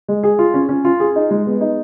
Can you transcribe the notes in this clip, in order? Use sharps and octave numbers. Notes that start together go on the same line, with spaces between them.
G#3
G#4
F4
C#4
C#4
F4
G#4
D#4
G#3
B3
D#4